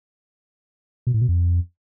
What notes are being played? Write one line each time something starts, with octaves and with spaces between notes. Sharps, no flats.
B2
A2
B2
F2